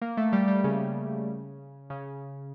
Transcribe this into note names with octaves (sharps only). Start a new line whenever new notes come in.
A#3
A3
G3
G3
C#3
C#3